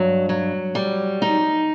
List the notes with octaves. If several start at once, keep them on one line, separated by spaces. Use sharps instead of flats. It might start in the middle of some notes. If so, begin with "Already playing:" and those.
Already playing: G2 F#3
F#3
G3
D#4